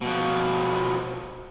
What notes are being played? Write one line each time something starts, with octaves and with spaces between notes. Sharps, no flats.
B2 F3